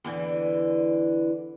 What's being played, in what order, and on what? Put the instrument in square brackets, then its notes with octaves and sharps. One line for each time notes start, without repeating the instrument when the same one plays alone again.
[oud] E2 D3 E3